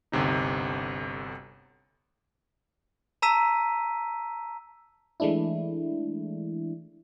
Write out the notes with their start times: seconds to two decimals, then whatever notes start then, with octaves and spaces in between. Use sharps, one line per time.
0.12 G1 D2 C3 D#4
3.22 A5 A#5 E6 B6 D#7
5.20 E3 G#3 A3 D4 E4